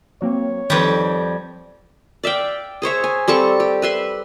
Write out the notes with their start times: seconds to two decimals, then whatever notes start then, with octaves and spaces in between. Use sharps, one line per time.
0.22 F#3 A#3 C4 C#5
0.70 F2 D#3 G3 B4
2.24 D5 E5 F5 G5
2.82 G#4 C5 C#5 E5
3.04 G#5
3.28 G3 C4 A4 C#6
3.60 G4
3.82 B4 E5 C6